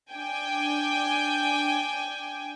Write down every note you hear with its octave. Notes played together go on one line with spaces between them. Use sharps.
D4 G5 G#5